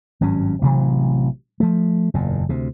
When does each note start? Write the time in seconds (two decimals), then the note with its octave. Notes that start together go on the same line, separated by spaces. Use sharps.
0.21 G#1 G2 F#3 C#4
0.62 A1 C3 E3 F#3
1.60 F3 A3
2.14 F#1 E2 A#2
2.49 D2 C3